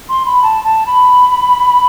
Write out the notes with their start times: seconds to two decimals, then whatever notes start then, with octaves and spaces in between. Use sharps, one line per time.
0.09 C6
0.26 B5
0.43 A5
0.64 A5
0.86 B5